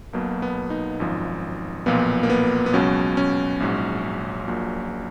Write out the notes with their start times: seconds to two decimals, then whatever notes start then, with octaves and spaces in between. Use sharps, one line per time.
0.13 B1 B2 F#3 A#3
0.42 B3
0.70 D#4
1.00 G#1 F#2 F3
1.86 B1 A#2 F3 B3
2.23 A#3
2.30 B3
2.66 B3
2.73 C#2 B2 F#3 C#4
3.17 C#4
3.60 A#1 G#2 F#3
4.47 A#1 A#2 F#3